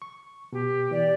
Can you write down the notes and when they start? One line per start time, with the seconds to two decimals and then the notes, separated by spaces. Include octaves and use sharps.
0.02 C#6
0.53 B2 G4
0.91 E3 D5